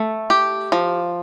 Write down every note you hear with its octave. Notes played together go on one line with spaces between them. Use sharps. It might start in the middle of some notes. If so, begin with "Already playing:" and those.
Already playing: A3
G4
F3